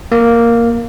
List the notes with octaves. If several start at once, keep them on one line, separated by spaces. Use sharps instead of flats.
A#3